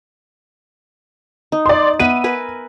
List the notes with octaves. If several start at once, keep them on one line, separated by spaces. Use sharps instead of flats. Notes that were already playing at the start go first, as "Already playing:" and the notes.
D#4
D5 C6
B3 B4 E5 D#7
A#4 B4 G#5